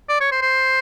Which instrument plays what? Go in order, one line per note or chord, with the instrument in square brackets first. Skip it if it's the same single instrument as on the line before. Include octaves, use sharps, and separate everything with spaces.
[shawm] D5
C#5
C5
C5